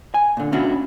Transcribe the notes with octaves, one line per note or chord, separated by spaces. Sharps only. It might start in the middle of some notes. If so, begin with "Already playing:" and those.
G#5
A#2 D3
B2 C#4 D4 E4 F#4